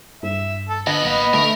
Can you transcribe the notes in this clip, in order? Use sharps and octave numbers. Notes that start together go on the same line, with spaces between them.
G2 E5
A4 A5
A#2 D3 B3 D#5 B5
A1 A#3 B3 B5
D3 A3 A#4 A#5